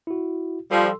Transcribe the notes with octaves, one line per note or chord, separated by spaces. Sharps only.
E4 F#4
F3 G3 A4 C6 E6